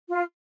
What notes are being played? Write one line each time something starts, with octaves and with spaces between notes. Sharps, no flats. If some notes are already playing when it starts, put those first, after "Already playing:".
F4